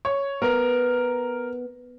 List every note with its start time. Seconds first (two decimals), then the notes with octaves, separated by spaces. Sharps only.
0.05 C#5
0.42 B3 A#4